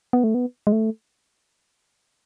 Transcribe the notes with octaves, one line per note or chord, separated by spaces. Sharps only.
B3
A3
B3
G#3
A3